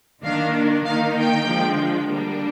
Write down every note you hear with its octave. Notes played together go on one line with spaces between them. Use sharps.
D#3 A#3 D4 F5
D#3 A#3 D#4 F5
G5
D3 F3 G#3
D3 G3 A#3 D4